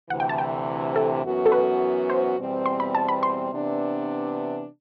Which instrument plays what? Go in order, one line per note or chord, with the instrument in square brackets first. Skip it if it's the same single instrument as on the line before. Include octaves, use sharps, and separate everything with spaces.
[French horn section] D2 C3 E3 [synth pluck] F#5
[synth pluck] G5
A5
G5
A4
[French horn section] F#2 E3 B3 F#4
[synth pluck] A4
B4
C5
[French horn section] E2 B2 G3 C4
[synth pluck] C6
B5
A5
B5
C6
[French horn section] C3 E3 B3 D4